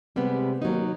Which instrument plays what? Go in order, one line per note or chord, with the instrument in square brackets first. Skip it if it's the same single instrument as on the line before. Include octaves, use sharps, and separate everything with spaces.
[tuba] C3 [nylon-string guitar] G3 G#3 B3
[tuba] D#2 [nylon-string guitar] F#3 D#4